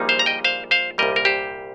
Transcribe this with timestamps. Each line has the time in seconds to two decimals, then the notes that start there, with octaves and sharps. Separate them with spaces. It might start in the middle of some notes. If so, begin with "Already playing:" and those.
Already playing: A#1 A#2 G3 A#3 D#4
0.09 C5 F5
0.19 A#5
0.26 D#5 G5
0.44 C5 F5
0.71 C5 F5
0.98 C2 A#2 G3 A#4 D#5
1.16 A#4
1.25 G4 C5